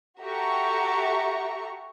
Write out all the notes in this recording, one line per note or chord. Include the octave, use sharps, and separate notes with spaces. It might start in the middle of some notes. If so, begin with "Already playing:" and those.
F#4 G4 A4 E5 A#5 C#6